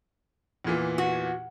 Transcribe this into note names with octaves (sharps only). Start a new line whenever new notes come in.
E2 A#2 E3
F#4